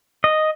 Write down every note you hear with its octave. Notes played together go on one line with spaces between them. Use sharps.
D#5